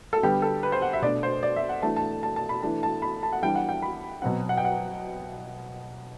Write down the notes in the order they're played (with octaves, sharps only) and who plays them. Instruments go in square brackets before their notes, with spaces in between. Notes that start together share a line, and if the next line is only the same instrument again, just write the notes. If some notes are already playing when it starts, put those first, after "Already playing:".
[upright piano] A4
D3 G3 B3 G4
A4
B4
C5
F#5
E5
B2 A3 D4 D5
C5
D5
E5
F#5
E3 A3 D4 A5
A5
A5
A5
B5
E3 A3 D4 A5
A5
B5
A5
F#5
E3 G3 D4 G5
F#5
G5
B5
B2 F#3 C4 F#5
F#5
G5
F#5